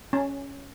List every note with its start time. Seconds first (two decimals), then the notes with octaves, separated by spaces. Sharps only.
0.13 C#4